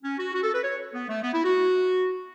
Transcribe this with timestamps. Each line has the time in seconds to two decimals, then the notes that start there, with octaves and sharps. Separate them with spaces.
0.03 C#4
0.18 F#4
0.33 F#4
0.43 A4
0.53 B4
0.63 C#5
0.93 B3
1.08 A3
1.22 B3
1.32 E4
1.43 F#4